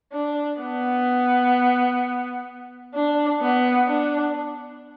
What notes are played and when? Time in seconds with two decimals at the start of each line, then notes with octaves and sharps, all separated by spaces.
0.12 D4
0.60 B3
2.94 D4
3.42 B3
3.88 D4